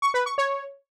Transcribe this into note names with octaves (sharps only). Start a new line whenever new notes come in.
C#6
B4
C#6
C#5